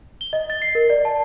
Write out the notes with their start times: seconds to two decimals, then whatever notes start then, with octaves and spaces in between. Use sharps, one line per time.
0.21 G7
0.33 D#5
0.50 A6
0.62 C7
0.75 A#4
0.90 D5
1.05 A5